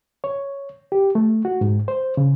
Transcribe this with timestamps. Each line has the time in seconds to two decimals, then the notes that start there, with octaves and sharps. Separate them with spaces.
0.24 C#5
0.92 G4
1.15 A3
1.45 F#4
1.61 G#2
1.88 C5
2.17 C#3